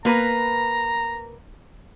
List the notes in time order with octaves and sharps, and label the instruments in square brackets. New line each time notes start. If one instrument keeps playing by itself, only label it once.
[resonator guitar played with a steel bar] A#3 B4 [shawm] A#5